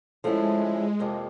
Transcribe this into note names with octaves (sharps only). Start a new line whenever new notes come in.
F3 G#3 A3 C#4 E4
F2 C3 F3 A#3